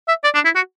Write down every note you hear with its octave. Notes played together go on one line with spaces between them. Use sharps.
E5
D5
D4
E4
F#4